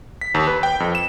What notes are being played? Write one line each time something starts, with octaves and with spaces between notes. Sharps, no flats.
B6
D#2
B4
G5
F2
E7